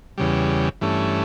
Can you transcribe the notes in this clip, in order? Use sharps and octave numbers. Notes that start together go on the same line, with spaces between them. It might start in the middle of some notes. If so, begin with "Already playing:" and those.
E2 C#3 G3
G2 E3 A3 C#4